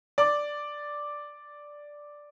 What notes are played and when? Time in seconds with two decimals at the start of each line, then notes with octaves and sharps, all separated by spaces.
0.18 D5 D6